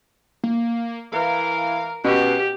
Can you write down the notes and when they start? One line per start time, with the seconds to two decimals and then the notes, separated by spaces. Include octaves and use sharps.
0.44 A#3
1.12 E3 A#4 F5
2.05 B2 C#4 G4